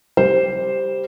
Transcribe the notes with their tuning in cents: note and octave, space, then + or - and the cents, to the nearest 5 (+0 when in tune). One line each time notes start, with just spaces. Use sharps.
G3 +0 C5 +0